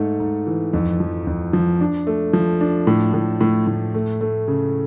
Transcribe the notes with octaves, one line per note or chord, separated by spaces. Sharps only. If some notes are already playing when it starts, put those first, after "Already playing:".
Already playing: G#2 A3
G#2
E3
F2
F3
F2
F3
D4
A3
F3
D4
A2
A2
A2
A2
A3
A3
C#3